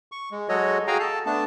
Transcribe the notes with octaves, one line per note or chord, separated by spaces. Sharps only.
C#6
G#3
F#3 G#3 F#4 A4 C#5 D#5
F#4 G#4 F5 G5 G#5 A#5
A4 A5
A3 B3 D4 A5